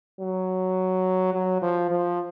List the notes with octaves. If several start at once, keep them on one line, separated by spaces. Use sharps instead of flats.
F#3
F#3
F3
F3